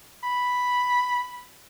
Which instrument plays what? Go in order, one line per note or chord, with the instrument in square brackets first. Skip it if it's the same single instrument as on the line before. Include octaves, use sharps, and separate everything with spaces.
[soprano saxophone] B5